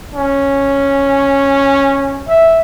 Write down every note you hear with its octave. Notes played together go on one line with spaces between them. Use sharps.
C#4
E5